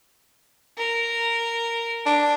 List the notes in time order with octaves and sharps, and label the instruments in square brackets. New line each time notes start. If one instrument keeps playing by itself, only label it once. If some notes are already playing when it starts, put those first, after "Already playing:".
[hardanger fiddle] A#4
[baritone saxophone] D4